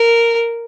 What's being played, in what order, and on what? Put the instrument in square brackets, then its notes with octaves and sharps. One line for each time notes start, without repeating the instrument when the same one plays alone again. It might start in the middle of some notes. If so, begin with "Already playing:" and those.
Already playing: [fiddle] A#4